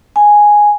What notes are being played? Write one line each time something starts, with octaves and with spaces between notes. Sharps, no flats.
G#5